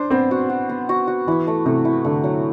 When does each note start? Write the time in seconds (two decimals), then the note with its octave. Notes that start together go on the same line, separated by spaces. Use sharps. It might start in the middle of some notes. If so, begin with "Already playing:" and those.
Already playing: D4 C5
0.11 B3 C4
0.31 F#4
0.50 F#4
0.69 B3
0.89 F#4
1.07 F#4
1.27 E3 E4
1.47 A3
1.66 C3 A3
1.85 E4
2.04 D3 A3
2.24 F#3